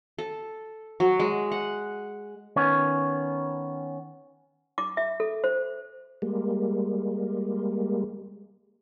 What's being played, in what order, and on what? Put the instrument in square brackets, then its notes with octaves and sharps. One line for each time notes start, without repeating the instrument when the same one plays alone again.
[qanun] A4
F#3
G#3
F#5
[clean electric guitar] D#3 B3 C#4 C#5
[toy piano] D6
E5
A4
C5
[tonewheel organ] G3 G#3 A#3